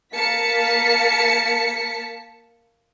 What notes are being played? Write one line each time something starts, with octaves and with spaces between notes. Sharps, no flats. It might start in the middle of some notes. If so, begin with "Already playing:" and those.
A#3 A5 B6 C#7